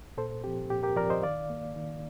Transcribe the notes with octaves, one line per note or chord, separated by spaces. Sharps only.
A#2 A4 C5
F3 C4 G4
A#2 G4
G4 A#4
F3 C4 A#4 D5
C5 D#5
D#3 D5 F5
A#3
D#3